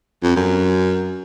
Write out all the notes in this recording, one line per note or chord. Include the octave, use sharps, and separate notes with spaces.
F2
F#2